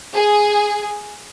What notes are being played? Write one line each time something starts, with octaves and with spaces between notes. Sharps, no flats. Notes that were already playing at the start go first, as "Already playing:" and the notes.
G#4